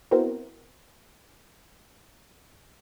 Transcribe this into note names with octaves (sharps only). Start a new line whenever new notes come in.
B3 C4 E4 F#4 A#4 C5